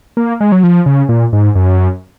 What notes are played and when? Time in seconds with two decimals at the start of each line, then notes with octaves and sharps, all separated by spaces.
0.17 A#3
0.41 G#3
0.52 F#3
0.63 F3
0.86 C#3
1.09 A#2
1.33 G#2
1.55 F#2